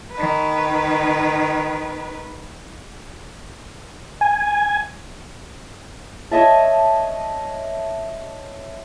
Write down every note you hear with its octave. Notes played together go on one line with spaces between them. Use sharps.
D#3 B4
G#5
C#5 D#5 E5 A5